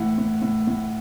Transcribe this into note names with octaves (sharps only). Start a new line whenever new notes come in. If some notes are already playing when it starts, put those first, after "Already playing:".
Already playing: A2 E3 F#5
A2
A2
A2